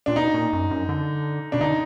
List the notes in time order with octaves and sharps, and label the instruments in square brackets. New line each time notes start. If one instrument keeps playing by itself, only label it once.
[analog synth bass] A#2 [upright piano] D4
[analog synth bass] B2 [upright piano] D#4
[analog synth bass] A#2
F#2
F#2
D3
[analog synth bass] B2 [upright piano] D4
[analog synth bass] D3 [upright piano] D#4